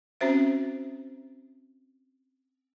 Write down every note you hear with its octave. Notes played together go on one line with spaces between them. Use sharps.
C4 C#4 F#4 C5 E5